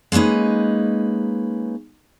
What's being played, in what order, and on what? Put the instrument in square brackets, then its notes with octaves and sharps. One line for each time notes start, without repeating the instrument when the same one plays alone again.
[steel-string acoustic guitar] G#3 A#3 C#4 D#4 B4